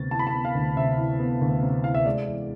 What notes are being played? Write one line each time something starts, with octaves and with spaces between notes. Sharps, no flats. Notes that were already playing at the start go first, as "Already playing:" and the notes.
Already playing: D2 C3 B3 A6
E3 A5
B5
A5
B3
F5
D2
C3 E5
E3
B3
D2
C3
E3 F5
E5
G#3 D5
E2